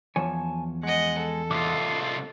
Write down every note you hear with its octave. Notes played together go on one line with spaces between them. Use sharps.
E2 F3 C#5 G#5 A5
G#3 D#5 F#5
A4
C2 F4 D#5 E5 D6